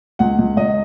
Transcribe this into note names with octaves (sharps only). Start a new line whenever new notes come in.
C#2 F#5
C#2
C#2 D#5